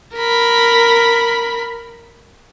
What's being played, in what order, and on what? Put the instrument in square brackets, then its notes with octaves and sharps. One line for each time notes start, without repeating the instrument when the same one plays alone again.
[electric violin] A#4 B5